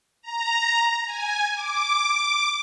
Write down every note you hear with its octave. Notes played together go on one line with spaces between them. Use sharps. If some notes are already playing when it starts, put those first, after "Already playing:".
A#5
G#5
D6